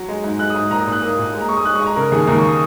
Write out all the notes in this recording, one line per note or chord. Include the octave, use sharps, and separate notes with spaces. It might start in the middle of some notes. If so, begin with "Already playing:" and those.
Already playing: F#3
G#3
G#2
G#3 F#6
D#6
G#2
A#2 A#5
D#6
A#2
F#6
A#3 D#6
A#2
G#3
A#5
G#3 C#6
D#6
G#3 F#6
C#6
G#3
A#5
C#3 A#4
D#2 G#4
D#2 A#4
C#6
D#6